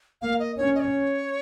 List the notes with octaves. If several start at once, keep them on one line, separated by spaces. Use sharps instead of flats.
A#3 F5
D#5
C#4 C#5
D#5
C#5